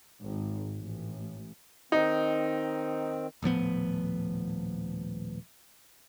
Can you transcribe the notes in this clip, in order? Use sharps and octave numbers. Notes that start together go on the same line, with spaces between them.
G#1
A1
D#3 C4 D#4
D#1 A2 F3 B3